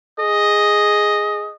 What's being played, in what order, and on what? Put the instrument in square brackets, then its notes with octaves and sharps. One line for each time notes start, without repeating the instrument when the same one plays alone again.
[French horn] G#4 [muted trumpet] D#5